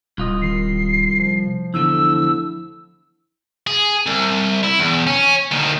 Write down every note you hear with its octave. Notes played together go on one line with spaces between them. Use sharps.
D1 C2 F4 D#5
D#3 C7
F3
E2 D3 A3 E4 E6
G#4
C2
E4
E2
C#4
D2 D#3